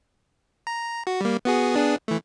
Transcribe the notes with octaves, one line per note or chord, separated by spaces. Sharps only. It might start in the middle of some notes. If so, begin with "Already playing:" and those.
A#5
F#4
G3 A#3
B3 F#4 G#4
B3 D4 G#4
E3 A3